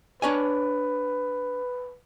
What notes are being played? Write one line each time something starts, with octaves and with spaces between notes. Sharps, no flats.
D4 B4 C#5 G#5